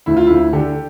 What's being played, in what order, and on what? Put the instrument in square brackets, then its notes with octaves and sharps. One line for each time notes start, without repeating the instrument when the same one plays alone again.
[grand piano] D2 E4
F4
D2 E4
D3 G4